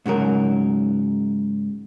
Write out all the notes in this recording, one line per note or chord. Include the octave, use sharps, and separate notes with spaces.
G#2 C#3 F#3 A#4